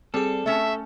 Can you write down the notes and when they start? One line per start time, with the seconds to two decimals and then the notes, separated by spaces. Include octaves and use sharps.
0.14 G3 C4 G#4 A4
0.46 A3 C#4 E5 A5